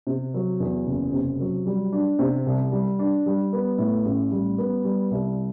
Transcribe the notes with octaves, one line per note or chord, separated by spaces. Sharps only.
C3
F#3
E2
F#1
C3
F#3
G3
D4
C3
C2
G3
D4
G3
B3
A2
A1
G3
B3
G3
C2